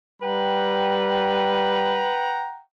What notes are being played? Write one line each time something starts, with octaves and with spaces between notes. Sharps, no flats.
G3 B4 F#5 G5 A#5